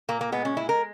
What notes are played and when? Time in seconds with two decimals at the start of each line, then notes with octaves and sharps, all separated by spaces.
0.09 A#2 A#3
0.21 A#3
0.32 G#3 B3
0.45 C#4
0.57 G#3 E4
0.69 A#4